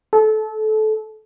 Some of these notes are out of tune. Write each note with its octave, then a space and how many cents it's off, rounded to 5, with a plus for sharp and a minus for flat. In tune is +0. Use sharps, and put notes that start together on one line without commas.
A4 -25